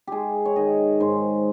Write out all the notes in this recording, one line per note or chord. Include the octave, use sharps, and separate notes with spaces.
G#3 G4 G#4
C#5
D#3 D#5
G#2 C5